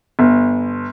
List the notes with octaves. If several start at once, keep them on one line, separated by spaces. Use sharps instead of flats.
G1